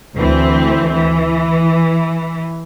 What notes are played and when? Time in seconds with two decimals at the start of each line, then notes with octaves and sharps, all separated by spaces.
0.15 D2 E3 C4
0.93 E3